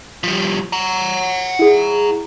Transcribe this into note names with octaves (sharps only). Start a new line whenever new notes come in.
F3 G3
F#5 A#5
E4 G#4